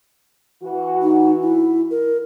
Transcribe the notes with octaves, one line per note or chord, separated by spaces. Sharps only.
E3 F#4
D#4
E4
A#4